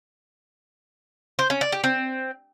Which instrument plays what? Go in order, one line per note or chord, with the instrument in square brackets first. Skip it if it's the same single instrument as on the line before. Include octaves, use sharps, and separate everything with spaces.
[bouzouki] C5
C#4
D5
G4
C4